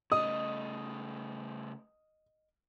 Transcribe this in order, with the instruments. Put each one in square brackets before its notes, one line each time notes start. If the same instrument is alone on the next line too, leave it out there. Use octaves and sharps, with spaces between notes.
[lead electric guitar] C#3 A3 [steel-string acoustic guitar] D#5 [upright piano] D#6